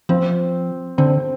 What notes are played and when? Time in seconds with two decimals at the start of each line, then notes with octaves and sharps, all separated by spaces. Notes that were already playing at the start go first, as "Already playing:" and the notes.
0.09 F3 C4
0.98 D3 C4